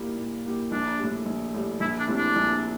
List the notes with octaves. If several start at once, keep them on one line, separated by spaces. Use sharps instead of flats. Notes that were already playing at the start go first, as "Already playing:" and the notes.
Already playing: G3 A#3 E4 G4
A#2
G3 A#3 E4 G4
A#1 D4
A2 G3
A#1
A2 G3
A#1 E4
D4
A2 G3 C4 E4
D4
A#1